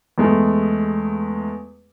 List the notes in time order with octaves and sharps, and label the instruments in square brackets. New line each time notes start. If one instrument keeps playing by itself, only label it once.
[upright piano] E2 G#3 A3